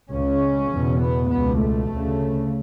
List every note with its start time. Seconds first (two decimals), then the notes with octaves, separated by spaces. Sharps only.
0.10 C#2 C#3 C#4
0.71 E2 B2
1.01 B3
1.31 C#2 B2 B3
1.61 A3
1.90 D2 C#3